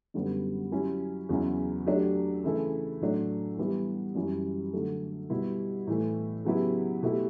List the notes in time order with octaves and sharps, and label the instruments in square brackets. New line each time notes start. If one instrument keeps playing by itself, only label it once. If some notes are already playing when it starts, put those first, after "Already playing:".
[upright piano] F#2 D3 G3 B3
F#3 C#4 E4 G4
E2 C#3 F#3 C#4 E4
F#3 A3 D4 G4
C#3 E3 A3 E4 A4
A2 F#3 A3 D4
E3 G3 B3 E4 G4
F#2 E3 G3 C#4 E4
D3 F#3 A3
B2 G3 B3 E4 G4
A2 E3 A3
C#3 F#3 B3 E4 G4
B2 A3 E4 G4